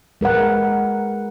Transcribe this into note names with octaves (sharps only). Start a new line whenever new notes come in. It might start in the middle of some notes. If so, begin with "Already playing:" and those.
G#3 A#4 B4 F#5